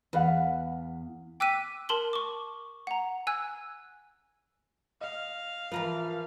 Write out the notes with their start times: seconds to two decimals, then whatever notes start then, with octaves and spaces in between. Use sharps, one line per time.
0.13 E2 B4 F5 F#5
1.40 G5 D6 E6 F#6 B6 D#7
1.89 A#4 A5 C6 F#7 G7
2.13 C#6 D6
2.87 F#5 A#5
3.27 G#5 E6 F#6 G#6
5.01 D#5 F5
5.72 E3 F3 A#4 B4